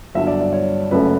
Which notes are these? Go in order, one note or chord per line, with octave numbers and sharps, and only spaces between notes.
G1 G2 F#3 E5
D5
D5
C#5
F#1 F#2 C#3 F#3 A3 B4